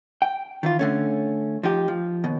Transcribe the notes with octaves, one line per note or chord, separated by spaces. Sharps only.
G5
D#3 E3 F4
D3 A3 C#4
F3 D#4 G4
F3
D#2 B2